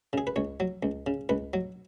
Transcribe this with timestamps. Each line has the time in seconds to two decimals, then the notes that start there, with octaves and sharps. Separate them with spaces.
0.13 C#3 G#4
0.27 B4
0.36 C#2 C#5
0.60 F#3
0.83 C#2
1.07 C#3
1.29 C#2 B4
1.54 F#3